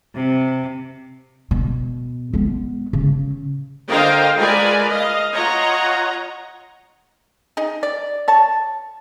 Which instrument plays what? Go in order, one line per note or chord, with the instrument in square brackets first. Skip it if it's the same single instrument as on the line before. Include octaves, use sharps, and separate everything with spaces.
[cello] C3
[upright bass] B2
G#3 B3
C#3
[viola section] D3 A#4 C5 D#5 F5 G5
G#3 F4 A#4 B4 D5 G#5
D#5 F5
F4 C#5 D#5 F#5 A#5
[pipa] D#4 G#4
D5
C#5 A5